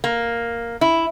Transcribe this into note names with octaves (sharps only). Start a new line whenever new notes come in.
A#3
E4